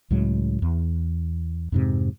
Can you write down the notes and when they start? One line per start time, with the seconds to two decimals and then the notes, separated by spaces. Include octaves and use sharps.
0.10 C#2 A2 F#3 G#3
0.62 E2
1.72 F2 G#2 C3